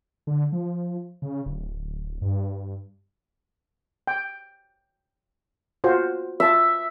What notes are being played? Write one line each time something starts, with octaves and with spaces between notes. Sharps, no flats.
D3
F3
C#3
D1
G2
G5
F4 F#4 C5
F4 E5 A5